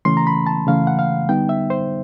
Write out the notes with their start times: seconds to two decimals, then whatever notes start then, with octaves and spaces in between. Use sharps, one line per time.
0.05 C#3 E3 A3 C#4 C6
0.17 A#5
0.27 B5
0.47 A5
0.67 C#3 E3 A3 C#4 F5
0.87 F#5
0.99 F5
1.29 D3 G3 B3 D#4 G5
1.49 E5
1.70 C5